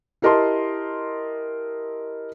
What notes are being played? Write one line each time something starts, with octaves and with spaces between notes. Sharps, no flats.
E4 G4 A#4 D#5 A5 C6